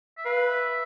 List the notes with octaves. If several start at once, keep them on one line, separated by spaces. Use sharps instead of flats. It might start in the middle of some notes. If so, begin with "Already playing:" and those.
E5
B4 F5
E5